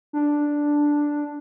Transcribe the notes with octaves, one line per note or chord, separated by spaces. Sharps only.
D4